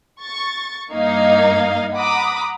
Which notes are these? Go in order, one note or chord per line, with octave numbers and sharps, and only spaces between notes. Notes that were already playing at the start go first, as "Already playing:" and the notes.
C#6 A6
G2 A#3 D#4 D#5 F5 G#6
F#5 A#5 B5 D6 D#6